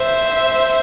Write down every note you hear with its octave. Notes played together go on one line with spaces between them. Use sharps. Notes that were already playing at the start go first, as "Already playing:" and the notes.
Already playing: C5 E5